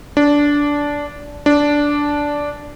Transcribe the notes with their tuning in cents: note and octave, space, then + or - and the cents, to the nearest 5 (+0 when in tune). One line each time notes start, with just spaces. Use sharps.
D4 -15
D4 -10